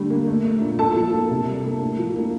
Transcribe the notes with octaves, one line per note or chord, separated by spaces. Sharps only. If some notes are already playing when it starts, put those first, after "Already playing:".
Already playing: D3 G3 A3
A#3
A3
A3
A#2
A#2 A4 A5
F3
A#3
C3
G3
A#3
A2
F3
A#3